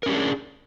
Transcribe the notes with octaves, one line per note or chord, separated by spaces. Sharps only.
C#4 D4 G4 G#4 A#4